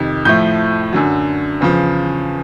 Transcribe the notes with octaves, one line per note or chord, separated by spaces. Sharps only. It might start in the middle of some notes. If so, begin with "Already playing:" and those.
Already playing: F2 C3 D#3
A2 F3 A3 G6
F#2 D3 F#3
E2 C#3 F3